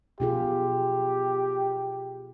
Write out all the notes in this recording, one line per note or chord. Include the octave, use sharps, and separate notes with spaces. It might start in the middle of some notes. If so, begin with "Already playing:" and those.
B2 F4 G4 G#4